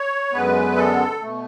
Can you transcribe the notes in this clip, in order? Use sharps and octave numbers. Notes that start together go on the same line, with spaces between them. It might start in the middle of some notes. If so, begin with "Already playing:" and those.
Already playing: C#5
F#2 D3 G#3 B3 B4
A4
B2 A3